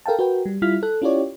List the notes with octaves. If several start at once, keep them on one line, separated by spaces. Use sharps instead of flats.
A4 A#4 F5 G5 A5
F#4 A#4 B4 G5
G3
G3 E4 F4 F6 B6
A4 F#6
C#4 E4 F4 G4 C#5 D5